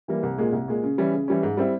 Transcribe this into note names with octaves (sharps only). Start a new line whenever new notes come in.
E3 G3 A#3
C2
A#2 G#3
C2
A#2 G#3
C#3
E3 G3 C#4
C#3
E3 G3 C#4
G#2
G3 C4 E4